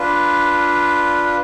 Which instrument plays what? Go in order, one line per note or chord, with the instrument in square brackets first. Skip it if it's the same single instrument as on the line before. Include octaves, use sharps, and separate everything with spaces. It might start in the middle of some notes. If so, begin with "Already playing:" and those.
Already playing: [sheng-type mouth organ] D4 F4 B4